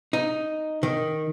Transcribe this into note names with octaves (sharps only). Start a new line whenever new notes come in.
D#4
D#3